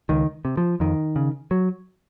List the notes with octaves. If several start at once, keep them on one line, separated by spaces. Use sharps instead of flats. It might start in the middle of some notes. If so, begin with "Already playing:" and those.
C#2 D#3
C3
F3
F2 D#3
C#3
F#3